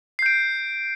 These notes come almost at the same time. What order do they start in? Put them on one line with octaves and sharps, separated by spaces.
C7 G6 D7